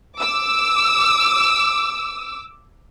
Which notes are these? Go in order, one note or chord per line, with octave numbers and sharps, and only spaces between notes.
D6 E6